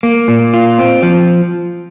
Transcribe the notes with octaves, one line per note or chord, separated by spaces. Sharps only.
A#3
A#2
F4
C4
F3